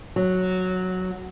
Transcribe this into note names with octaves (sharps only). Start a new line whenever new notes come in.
F#3